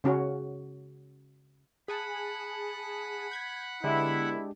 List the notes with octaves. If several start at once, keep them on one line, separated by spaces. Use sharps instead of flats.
C#3 C#4 F#4
G#4 F#5 G#5 A5 B5
G6 G#6 B6
D3 G#3 B3 D4 E4 G4